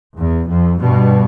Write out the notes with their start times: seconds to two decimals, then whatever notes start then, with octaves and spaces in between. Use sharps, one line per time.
0.18 E2
0.49 F2
0.80 G2 B2